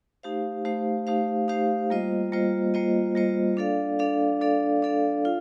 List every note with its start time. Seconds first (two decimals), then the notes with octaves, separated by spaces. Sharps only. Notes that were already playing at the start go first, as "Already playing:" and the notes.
0.23 A3 D#4 G4 C5 F5
0.65 A3 D#4 G4 C5 F5
1.07 A3 D#4 G4 C5 F5
1.48 A3 D#4 G4 C5 F5
1.90 G3 A#3 F4 C5 D#5
2.32 G3 A#3 F4 C5 D#5
2.74 G3 A#3 F4 C5 D#5
3.15 G3 A#3 F4 C5 D#5
3.57 D4 A4 D5 F5
3.99 D4 A4 D5 F5
4.41 D4 A4 D5 F5
4.82 D4 A4 D5 F5
5.25 F4 F5